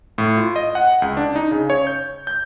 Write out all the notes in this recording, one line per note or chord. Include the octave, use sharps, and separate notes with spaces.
A2
F4
D#5
F#5
C#2
D4
D#4
C#3
C#5
G6
G6